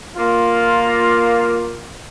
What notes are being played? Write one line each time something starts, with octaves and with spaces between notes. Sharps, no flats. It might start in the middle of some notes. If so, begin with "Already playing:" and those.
A#3 F4